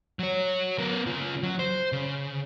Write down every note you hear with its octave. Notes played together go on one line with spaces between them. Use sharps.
F#3 C#5
B3 A#4
C#3 F4
F#3
C5
C#3